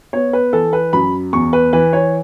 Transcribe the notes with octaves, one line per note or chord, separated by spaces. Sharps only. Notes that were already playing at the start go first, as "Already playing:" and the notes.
B3 C#5
B4
E3 A4
B4
F#2 B5
E2 C#6
B4
E3 B4
C#5